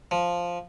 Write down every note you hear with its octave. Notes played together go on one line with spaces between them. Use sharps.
F3